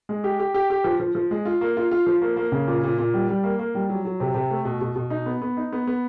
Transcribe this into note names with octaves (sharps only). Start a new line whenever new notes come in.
G#3
G4
G4
G4
G4
F3
F3
F3
G#3
F4
A#3
F4
F4
F3
A#3
A#3
C#3
A#2
A#2
A#2
G3
G3
A#3
A#3
G3
F#3
F#3
C3
C3
A3
B2
B2
B2
D#4
B3
B3
D#4
B3
B3